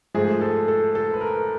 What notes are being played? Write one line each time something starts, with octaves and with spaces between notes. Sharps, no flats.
G#2 F3 A3 G#4
A4
A4
A4
B4
A#4